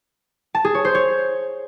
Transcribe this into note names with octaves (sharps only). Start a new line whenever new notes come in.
A5
G#4
C#5
C5
C#5